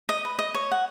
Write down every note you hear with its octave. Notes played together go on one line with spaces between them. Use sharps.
D#5
B4
D#5
C#5
F#5